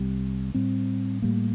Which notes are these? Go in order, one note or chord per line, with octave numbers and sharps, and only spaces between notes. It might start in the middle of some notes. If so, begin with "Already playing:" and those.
Already playing: C2 C3 G3
A2 G3 C4
A2 G3 A#3